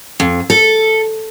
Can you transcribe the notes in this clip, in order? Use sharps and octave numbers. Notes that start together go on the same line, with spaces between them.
F2
A4